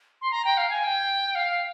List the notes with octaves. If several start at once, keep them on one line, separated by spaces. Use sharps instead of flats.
C6
A#5
G5
F5
G#5
G5
F5